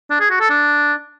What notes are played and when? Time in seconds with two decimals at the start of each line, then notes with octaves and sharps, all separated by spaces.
0.10 D4
0.20 G#4
0.30 F#4
0.40 A4
0.50 D4